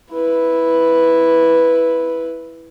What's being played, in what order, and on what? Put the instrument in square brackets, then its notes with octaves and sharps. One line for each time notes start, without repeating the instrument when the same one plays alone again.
[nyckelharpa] E4 B4